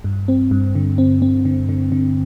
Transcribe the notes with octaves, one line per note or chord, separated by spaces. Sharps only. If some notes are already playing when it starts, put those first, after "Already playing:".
G2
C4
G2
D3
C4
C4
D3
D3
D3